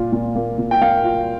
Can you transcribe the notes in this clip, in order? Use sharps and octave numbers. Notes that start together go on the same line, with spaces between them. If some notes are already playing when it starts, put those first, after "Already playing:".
Already playing: A#2 F4
A#2
A#3
A#2
G5
A#3 F5
F4